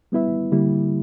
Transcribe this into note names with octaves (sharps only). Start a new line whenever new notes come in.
G3 B3 E4 B4 E5
D3 G3 A#3 E4 G4